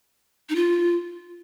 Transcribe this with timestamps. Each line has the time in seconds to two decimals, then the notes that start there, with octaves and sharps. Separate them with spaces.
0.50 D#4
0.56 F4